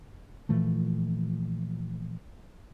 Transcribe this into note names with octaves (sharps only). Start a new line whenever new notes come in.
A#2 E3 F3 A3